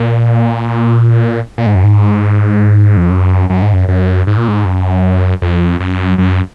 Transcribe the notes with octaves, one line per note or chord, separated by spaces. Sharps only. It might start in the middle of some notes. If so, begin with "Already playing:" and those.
Already playing: A#2
A#2
G#2
F#2
G#2
F2
F#2
F#2
G#2
F#2
F#2
G#2
A#2
G#2
F#2
F2
F#2
F#2